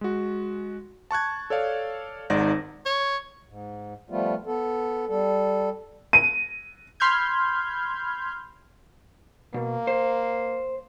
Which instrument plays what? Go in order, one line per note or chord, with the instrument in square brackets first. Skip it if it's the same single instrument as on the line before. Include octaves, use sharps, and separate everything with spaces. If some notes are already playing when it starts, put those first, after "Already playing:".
[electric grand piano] G#3 F#4
A5 C#6 F#6 G#6
A4 C#5 D5 F5
G#1 G#2 D#4 D5 F#5 A#6
[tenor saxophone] C#5
[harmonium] G#2
F3 G3 A3 B3 F4
B3 A4
G3 A4
[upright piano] D#7
[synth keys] B5 C6 F6 G6 G#6
[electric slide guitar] B2 [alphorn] A#3
[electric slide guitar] C5